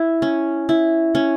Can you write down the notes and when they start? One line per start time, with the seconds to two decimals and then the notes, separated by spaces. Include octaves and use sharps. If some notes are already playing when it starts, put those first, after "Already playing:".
Already playing: E4
0.22 C#4
0.69 E4
1.15 C#4